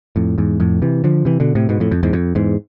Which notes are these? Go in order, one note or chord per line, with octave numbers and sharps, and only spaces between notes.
F2 A2
E2 G#2
F2 A2
C3 E3
D3 F3
C3 E3
B2 D3
A2 C3
G#2 B2
F2 A2
F2
E2 G#2
F2
E2 G#2